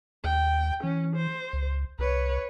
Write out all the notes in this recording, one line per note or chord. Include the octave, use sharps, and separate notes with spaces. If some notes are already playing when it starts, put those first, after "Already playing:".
D#2 G5
E3 C#4
C5
C#2
C2 B4 C#5